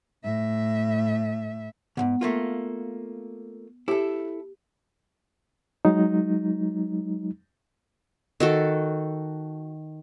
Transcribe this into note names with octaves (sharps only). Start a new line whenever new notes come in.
A2 E5
C#2 G#2 B3 F#5
A3 A#3 F4
E4 G4 A4
F#3 G#3 D#4
D#3 F#4 A4